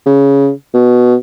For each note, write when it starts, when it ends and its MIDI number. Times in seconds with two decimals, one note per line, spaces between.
0.06 0.50 49
0.74 1.15 47